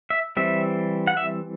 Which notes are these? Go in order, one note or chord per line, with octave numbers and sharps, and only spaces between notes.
E5
E3 G3 C4 E5
F#5
E5